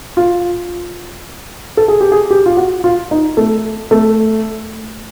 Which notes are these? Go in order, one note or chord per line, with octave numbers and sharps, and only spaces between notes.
F4
A4
G#4
G4
G#4
G4
F4
F#4
F4
D#4
A3
A3